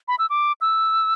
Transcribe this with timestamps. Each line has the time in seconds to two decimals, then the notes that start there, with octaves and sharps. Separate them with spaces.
0.08 B5
0.19 E6
0.30 D6
0.61 E6